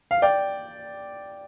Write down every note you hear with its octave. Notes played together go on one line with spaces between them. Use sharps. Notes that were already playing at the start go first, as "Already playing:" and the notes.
F5
D5 G5